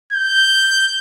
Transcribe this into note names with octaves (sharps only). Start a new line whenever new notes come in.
G6